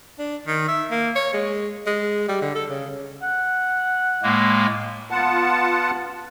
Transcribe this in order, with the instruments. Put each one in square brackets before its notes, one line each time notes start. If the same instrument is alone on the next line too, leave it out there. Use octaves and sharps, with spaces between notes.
[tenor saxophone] D4
D#3
E5
A#3
C#5
G#3
G#3
G3
D3
A4
C#3
[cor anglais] F#5
[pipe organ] A2 G#3 A#3
[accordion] B3 F4 F#5 A5